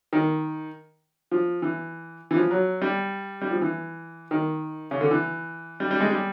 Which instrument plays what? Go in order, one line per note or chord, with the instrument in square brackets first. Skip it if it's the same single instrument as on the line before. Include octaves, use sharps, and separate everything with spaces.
[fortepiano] D#3
F3
E3
E3
F3
F#3
G3
G3
F3
E3
D#3
C#3
D3
E3
G3
G3
G#3
G3